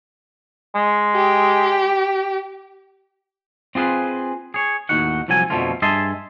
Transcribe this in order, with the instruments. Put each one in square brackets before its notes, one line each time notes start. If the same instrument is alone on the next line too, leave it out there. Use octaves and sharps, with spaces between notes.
[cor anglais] G#3
[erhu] G4
[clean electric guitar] C4 F4 G#4 B4 F5
G#4 C#5
D#2 A2 D#4 F#4 F#5
C2 F3 F#3 A4 G#5
F2 B2 D3 F3 A3 F4
G2 G#4 D#5 E5 A5 C6